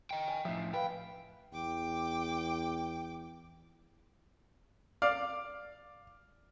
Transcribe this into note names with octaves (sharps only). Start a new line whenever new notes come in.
D#5 G5
G#5
A2 F3 E5
B4 F5 G5
E2 G5 D6
D5 F5